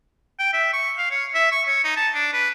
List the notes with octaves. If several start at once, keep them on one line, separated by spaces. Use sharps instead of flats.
G5
E5
C#6
F5
C#5
E5
C#6
C#5
D#4
A5
D4
B4